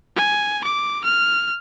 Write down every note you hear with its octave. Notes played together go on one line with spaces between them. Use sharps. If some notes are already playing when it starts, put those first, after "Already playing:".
G#5
D6
F6